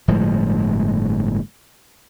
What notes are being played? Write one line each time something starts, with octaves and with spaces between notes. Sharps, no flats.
G1 A2 F3 G#3